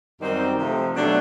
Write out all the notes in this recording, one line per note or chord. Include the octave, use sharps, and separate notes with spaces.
F#2 D#3 G3 C4 D#4
C3 F3 A3
B2 F#3 A3 D4